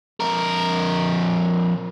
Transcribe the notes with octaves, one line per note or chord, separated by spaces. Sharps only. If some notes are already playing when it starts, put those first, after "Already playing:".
F2 A#4